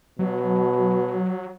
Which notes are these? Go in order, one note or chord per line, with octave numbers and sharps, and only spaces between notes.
B2 F#3